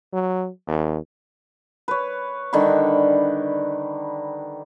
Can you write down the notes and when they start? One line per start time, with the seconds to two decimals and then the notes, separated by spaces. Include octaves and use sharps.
0.13 F#3
0.68 D#2
1.88 B4 C#5
2.53 D3 D#3 G3 B5